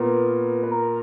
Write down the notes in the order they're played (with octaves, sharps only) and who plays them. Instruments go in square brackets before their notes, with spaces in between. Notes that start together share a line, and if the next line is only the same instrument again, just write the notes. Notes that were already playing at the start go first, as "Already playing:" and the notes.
Already playing: [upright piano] A#2 A#4 [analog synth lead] B3
[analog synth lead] B4
A#4